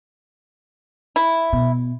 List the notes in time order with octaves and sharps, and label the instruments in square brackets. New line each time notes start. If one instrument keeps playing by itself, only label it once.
[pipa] E4
[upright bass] B2